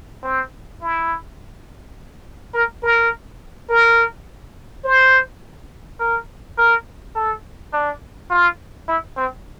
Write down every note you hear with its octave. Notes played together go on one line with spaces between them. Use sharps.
C4
E4
A#4
A#4
A#4
C5
A#4
A#4
A4
D4
F4
E4
C4